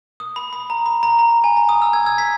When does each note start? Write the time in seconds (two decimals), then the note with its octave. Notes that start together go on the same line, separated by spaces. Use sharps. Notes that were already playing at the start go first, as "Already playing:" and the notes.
0.20 D#6
0.36 B5
0.53 B5
0.70 A#5
0.86 B5
1.03 A#5
1.19 A#5
1.44 G#5
1.57 A#5
1.69 D#6
1.82 E6
1.93 E6 G#6
2.06 E6 G#6
2.18 G#6 B6